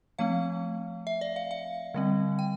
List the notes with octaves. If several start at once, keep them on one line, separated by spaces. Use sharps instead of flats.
F3 A3 C4 F5
E5
D5
F5
F5
D3 G3 C4
G5